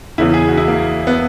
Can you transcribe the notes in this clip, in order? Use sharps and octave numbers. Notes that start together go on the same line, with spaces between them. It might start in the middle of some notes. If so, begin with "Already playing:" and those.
E1 E2 C#3 E3 E4
G#4
F#4
E4
A#3
B3